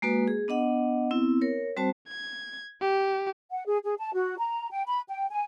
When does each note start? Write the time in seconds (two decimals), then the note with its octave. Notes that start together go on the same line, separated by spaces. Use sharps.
0.02 G#3 A#3 F#4 B4
0.28 G#4
0.48 B3 D4 D#5 F#5
1.11 B3 C4 E4
1.41 A#4 C#5
1.77 G3 C4 F#4 C5 A5
2.08 G#6
2.81 G4
3.51 F#5
3.66 G#4
3.84 G#4
3.99 A5
4.14 F#4
4.38 A#5
4.71 G5
4.87 B5
5.08 G5
5.30 G#5